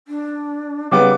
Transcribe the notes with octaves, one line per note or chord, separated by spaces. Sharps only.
D4
C#3 G3 B3 D#4 D6